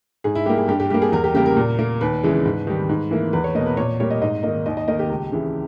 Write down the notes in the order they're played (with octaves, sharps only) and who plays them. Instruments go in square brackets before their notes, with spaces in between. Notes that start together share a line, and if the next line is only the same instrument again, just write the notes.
[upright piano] G#2 G#4
E4
G3 A#3 G4
G#4
G2 G4
G4
G3 A#3 G4
G#4
E2 A#4
G4
C#3 G3 A#3 G4
A#4
A#2
A#3
D#2 B4
C#3 E3 G#3
G#2
D#3 G3
G#2
E3 A#3
E2 B4
C#5
B2 A#3 D#5
B4
A#2 C#5
G3 A#3 C#5
D#5
G#2 D#5
D#3 A#3 D#5
D#2 D#5
D#5
D#3 A#3 D#5
G4
C#2
C#3 E3 G#3